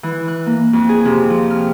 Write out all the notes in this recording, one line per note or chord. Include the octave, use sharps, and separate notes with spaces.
E3
F#6
A#3
F2
G#4
C3
F3
F6